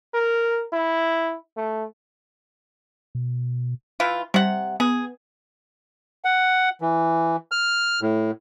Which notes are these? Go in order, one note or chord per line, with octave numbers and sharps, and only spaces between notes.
A#4
E4
A3
B2
E3 E4 F4
C3 G3 F#5
B3 G#4
F#5
E3
F6
A2